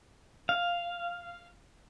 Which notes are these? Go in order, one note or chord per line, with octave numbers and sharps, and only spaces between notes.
F5